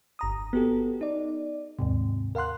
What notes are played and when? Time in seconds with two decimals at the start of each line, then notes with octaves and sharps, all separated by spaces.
0.19 G1 A#5 D#6
0.53 B3 F#4 G4 A4
1.01 D#4 D5
1.79 D#2 G#2 C3
2.35 A#4 F5 F#5 C6 F#6